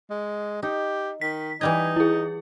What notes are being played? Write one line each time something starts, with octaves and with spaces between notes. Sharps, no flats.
G#3
D#4 G4
D#3 B6
E3 G3 D#4 D#5 G#6
E4 G#4